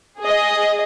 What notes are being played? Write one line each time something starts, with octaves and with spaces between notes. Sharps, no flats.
G#4 D#5